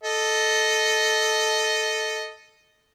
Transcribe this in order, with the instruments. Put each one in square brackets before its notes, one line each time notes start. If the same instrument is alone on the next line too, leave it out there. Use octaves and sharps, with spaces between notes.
[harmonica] A4 D#5